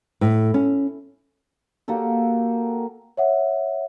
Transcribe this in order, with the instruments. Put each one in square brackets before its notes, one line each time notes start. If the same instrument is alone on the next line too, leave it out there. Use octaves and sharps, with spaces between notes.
[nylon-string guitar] A2
C#4
[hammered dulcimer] A#3 F#4 G4 A4
[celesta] C#5 E5 F#5